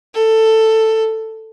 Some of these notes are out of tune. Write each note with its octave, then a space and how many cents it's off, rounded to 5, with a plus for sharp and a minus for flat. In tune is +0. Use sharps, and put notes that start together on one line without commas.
A4 +10